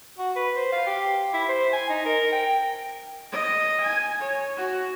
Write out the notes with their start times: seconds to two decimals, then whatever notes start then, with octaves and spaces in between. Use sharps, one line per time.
0.18 F#4
0.36 B4
0.56 C5
0.72 F5
0.87 G4
1.33 E4
1.49 C5
1.73 G#5
1.89 D#4
2.05 A#4
2.32 G5
3.32 D#5
3.81 G#5
4.21 C#5
4.57 F#4